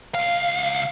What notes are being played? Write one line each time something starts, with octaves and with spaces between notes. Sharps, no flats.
C#2 F5